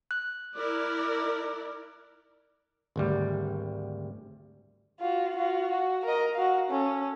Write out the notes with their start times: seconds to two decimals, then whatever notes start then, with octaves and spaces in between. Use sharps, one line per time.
0.11 F#6
0.55 E4 A#4 D5
2.96 G#1 D2 G3
5.00 F4 F#4
5.36 F4 F#4
5.71 F#4
6.05 A#4 D#5
6.35 F#4 F5
6.69 C#4 A4